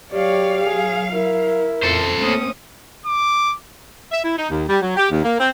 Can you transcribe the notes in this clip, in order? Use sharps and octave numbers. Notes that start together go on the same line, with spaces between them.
F#3 G4 C#5 D5 F5
G#4
E4 A#4
F2 A4 C5
A3 A#3 C4 C#4 D#6
D6
E5
E4
D#4
D#2
G3
F#3
G4
D#2
A#3
C4